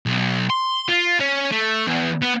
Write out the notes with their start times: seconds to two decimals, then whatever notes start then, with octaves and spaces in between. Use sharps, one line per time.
0.06 B1
0.50 C6
0.89 F4
1.20 C#4
1.51 A3
1.87 E2
2.22 B3